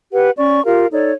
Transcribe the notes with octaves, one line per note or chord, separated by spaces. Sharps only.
G4 B4 F#5
C#4 D5 C#6
F4 G4 A#4 F5
D#4 A4 C#5 D5